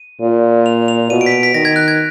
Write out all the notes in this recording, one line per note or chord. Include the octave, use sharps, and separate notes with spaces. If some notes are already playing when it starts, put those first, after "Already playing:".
Already playing: D#7
A#2
F7
F7
B2 D#7
D7
B6
D7
B6
D#3 A#6
G#6
F#6
G#6